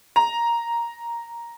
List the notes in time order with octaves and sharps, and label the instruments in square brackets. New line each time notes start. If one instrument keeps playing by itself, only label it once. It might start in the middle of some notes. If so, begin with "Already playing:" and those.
[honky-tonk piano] A#5